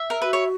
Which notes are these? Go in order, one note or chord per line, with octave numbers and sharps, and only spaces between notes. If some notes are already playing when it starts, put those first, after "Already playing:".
Already playing: E5
A#4
F#4 B4
C#5